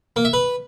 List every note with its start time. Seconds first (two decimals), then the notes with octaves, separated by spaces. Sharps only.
0.16 A#3
0.25 E5
0.33 B4